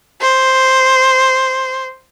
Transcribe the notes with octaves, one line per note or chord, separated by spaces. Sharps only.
C5